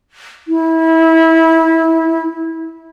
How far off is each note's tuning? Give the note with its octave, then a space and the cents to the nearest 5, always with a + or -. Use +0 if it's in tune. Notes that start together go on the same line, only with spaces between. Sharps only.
E4 -25